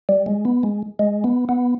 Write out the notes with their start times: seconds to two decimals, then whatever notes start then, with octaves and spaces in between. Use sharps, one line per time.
0.09 G3
0.26 G#3
0.45 B3
0.63 G#3
0.99 G#3
1.24 B3
1.49 B3